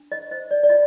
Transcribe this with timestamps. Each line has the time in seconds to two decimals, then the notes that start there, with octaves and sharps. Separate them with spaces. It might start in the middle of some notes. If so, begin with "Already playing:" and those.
Already playing: D4
0.12 D#5
0.31 C5 D#5
0.51 D5
0.63 D5
0.69 F4 D#5